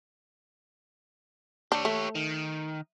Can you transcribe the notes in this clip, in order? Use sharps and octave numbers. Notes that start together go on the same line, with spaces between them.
D4 G4 C#5
A3
D#3